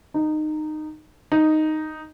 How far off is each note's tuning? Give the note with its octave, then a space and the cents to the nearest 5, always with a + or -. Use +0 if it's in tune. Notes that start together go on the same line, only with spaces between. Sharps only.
D#4 -20
D#4 -5